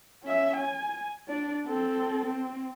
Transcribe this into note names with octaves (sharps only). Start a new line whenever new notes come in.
C#4 E5
G#5
D4 D5
C4 A4
C4